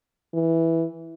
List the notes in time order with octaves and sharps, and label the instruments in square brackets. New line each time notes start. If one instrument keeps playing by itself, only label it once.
[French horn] E3